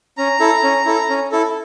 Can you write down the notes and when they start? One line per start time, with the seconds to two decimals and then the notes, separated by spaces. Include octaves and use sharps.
0.17 C#4 A#5
0.40 E4 A4
0.63 C#4
0.86 E4 A4
1.10 C#4
1.32 E4 A4